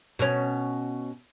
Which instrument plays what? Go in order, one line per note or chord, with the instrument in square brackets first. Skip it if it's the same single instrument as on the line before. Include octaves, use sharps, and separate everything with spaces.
[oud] B2 C#4